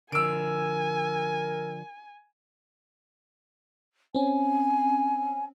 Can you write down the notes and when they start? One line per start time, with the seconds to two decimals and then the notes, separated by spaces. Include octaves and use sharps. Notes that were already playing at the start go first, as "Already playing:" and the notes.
0.12 D3 F3 A#4 G#5 E6 D7
4.15 C4 C#4 G#5